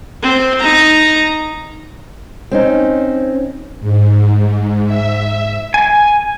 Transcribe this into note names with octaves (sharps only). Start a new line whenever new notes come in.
C4
D#4 A#5
C4 C#4 D#4
G#2
E5
G#5